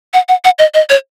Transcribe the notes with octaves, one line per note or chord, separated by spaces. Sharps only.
F#5
F#5
F#5
D#5
D#5
C#5